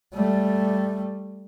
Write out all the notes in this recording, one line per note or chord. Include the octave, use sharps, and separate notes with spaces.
G3 A3